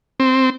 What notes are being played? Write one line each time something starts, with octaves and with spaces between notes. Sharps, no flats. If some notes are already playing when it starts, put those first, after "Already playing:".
C4